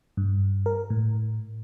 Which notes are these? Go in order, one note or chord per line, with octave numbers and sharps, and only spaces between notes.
G2
A#4
A2